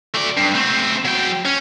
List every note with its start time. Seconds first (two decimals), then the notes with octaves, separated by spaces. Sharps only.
0.15 A3 D5
0.37 G2
0.54 A3 C4
1.05 F#3 G5
1.45 C#4